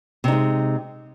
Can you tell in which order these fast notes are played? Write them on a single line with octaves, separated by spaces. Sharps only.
C3 D#4 G#3